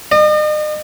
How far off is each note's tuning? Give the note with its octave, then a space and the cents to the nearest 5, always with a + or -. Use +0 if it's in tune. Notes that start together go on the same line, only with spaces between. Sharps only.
D#5 -40